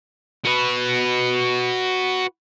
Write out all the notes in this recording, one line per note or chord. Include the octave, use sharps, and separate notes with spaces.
F#4 B4